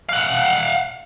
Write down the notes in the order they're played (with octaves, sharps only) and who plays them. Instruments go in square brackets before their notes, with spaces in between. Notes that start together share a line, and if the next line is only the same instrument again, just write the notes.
[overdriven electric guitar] F5 F#5